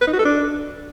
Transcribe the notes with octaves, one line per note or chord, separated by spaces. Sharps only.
B4
D#4
F#4
A4
D4